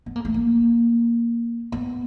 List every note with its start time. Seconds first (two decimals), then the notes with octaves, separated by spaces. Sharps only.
0.06 B3
0.16 A#3
0.25 A3
0.34 A#3
1.72 B3